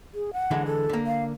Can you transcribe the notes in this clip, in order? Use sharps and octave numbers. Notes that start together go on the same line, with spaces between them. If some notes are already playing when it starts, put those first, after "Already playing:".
G#4
F#5
D3 E3 G#3
A4
D3 A#3
F5